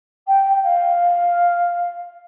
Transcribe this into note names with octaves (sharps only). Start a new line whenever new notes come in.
G5
F5